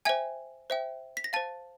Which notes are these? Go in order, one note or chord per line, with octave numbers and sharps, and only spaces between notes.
C5 E5 G5 G#5 G#6
C5 E5 G5
B6
A#6
C5 F5 A5 A6